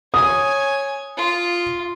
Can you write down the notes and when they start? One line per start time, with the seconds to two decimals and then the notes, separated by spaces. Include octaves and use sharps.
0.14 C#5 G#5 D#6
1.17 F4